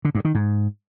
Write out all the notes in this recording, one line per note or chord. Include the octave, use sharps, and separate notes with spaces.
D3
G2
D#3
G#2